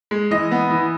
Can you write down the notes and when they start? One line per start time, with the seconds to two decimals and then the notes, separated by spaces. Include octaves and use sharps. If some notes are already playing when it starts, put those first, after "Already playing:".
0.11 G#3
0.31 E3 D#5
0.51 B3
0.70 E3